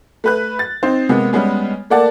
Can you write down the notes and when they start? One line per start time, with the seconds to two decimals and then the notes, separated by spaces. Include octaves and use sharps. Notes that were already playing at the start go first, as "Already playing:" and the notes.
0.24 A3 B4 F#6
0.59 A6
0.83 C4 D#4 C5
1.09 C3 G#3 A#3 B3
1.33 G3 G#3 B3 C#4
1.90 A3 A#3 D5 F#5 A5